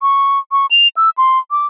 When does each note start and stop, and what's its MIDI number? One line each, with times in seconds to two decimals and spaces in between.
0.02 0.39 85
0.52 0.66 85
0.71 0.88 101
0.97 1.10 88
1.18 1.39 84
1.51 1.67 86